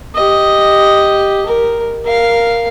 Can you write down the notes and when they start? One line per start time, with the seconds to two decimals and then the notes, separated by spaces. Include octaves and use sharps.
0.15 G4 D#5
1.46 A#4
2.05 A#4 F5